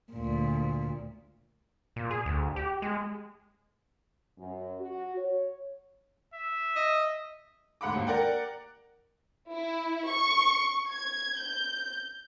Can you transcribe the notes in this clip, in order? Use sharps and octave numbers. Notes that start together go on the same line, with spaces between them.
D2 A#2
A#2
G#4
D2
G4
G#3
F#2
F#4
C#5
E5
D#5
D2 G#2 F#5 B5 D6
D#2
A#4 D5 F#5 G5
E4
C#6
G#6
G6